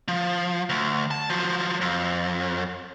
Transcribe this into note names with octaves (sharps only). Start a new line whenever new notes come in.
F3
D2
A5
F3 F#3
F2